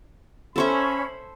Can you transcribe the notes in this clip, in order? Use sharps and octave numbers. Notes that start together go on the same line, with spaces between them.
C#4 A4 C5 E5 B5